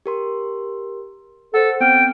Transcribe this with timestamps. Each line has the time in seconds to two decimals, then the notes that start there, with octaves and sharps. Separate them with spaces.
0.06 G4 A#4 C6
1.54 A4 C5 F#5
1.80 B3 C4 G5 F6